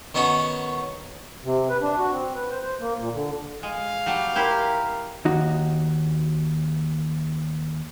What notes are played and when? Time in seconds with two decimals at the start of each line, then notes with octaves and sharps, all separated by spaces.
0.14 D#3 B3 C#4 F#4
1.44 C3
1.69 B4
1.82 D4
1.98 F#4
2.11 C4
2.35 B4
2.50 C5
2.62 C5
2.80 A#3
2.99 A#2
3.13 D3
3.63 G#3 F5
4.06 F#3 G3 A5
4.35 E4 G4 A#4 C5
5.25 D#2 D#4 F#4